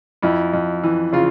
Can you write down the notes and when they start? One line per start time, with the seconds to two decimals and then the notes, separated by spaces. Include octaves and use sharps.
0.22 F2 E4
0.53 F2
0.83 E3
1.12 C#3 F4